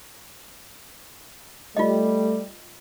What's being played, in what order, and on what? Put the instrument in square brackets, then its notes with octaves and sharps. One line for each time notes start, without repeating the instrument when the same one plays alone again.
[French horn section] G3 [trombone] A3 [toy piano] F4 D#5